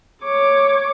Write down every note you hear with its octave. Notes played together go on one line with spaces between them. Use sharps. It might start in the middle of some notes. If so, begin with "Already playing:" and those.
C#5 D6